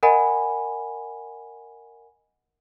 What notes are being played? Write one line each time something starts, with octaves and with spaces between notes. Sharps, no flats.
A#4 D#5 F#5 G#5 B5